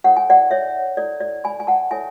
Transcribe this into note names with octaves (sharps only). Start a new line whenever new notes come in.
E4 A4 C#5 F#5
G#5
D5 F#5
C#5 E5
E4 A4 C#5 D5
D5
G#5 B5
G#5
F#5 A5
E4 A4 C#5 E5 G#5